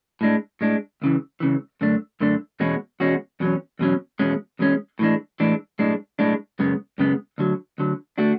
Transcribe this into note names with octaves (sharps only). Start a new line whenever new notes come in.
A2 G#3 D4
A2 G#3 D4
C#2 C#3 E3
C#2 C#3 E3
F#2 D3 A3 D4
F#2 D3 A3 D4
E2 B2 G#3 C#4 F#4
E2 B2 G#3 C#4 F#4
E2 B2 F#3 C#4
E2 B2 F#3 C#4
E2 B2 G#3 C#4
E2 B2 G#3 C#4
A2 E3 G#3 D4
A2 E3 G#3 D4
B1 A2 G#3 D4
B1 A2 G#3 D4
F#2 C#3 G#3 B3
F#2 C#3 G#3 B3
D2 D3 F#3
D2 D3 F#3
D3 A3 D4 F#4